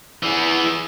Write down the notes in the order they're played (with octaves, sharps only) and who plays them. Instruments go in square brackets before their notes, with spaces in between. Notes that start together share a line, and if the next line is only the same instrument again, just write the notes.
[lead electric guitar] E3 G#4